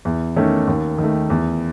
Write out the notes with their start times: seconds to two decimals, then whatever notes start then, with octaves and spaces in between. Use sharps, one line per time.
0.05 E2
0.36 D#3 A3 C#4
0.68 D#2
0.98 D#3
1.04 A3
1.30 E2